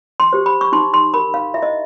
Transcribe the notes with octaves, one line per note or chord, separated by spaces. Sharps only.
C6
G4 C5
B5
C#6
D#4 C6
C6
G4 A#4 B5
F5
E4 E5
D#5